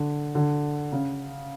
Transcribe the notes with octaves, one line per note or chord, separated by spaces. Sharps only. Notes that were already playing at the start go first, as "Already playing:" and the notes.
Already playing: D3
D3
C#3